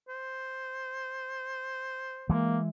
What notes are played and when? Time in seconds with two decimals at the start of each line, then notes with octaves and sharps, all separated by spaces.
0.08 C5
2.30 E3 G#3 A#3